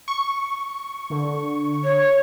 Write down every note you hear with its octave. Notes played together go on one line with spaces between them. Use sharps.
C#6
D3
C#5